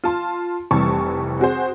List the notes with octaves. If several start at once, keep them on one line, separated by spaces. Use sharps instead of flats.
F4 A5 C6
F1 C3 E3 G3 A5 C#6
C4 F#4 G#4 C5